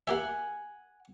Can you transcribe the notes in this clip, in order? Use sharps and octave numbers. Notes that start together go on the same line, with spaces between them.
A#3 G4 E5 F#5 G#5